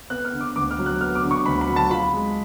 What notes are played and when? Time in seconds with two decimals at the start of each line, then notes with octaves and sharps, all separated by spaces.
0.10 B3 F#6
0.25 F6
0.33 D3
0.41 D6
0.56 D2 D6
0.71 F6
0.79 F#3
0.86 F#6
1.01 B3 F6
1.15 D6
1.24 D3
1.31 C#6
1.46 D2 B5
1.61 B5
1.68 F#3
1.76 A5
1.91 F4 B5
2.13 G#3